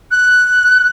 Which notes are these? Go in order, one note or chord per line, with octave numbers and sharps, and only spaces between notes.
F#6